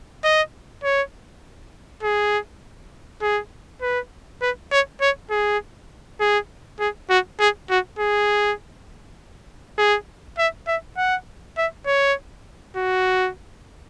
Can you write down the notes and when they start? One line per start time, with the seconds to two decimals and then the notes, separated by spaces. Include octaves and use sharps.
0.24 D#5
0.84 C#5
2.03 G#4
3.22 G#4
3.81 B4
4.41 B4
4.71 C#5
5.01 C#5
5.31 G#4
6.20 G#4
6.79 G#4
7.09 F#4
7.39 G#4
7.70 F#4
7.99 G#4
9.78 G#4
10.38 E5
10.67 E5
10.97 F#5
11.58 E5
11.86 C#5
12.76 F#4